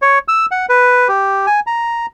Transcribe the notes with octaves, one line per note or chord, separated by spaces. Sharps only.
C#5
E6
F#5
B4
G4
G#5
A#5